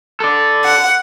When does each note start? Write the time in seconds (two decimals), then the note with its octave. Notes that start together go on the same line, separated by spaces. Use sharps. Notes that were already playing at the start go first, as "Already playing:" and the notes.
0.20 A4 D5
0.63 F#5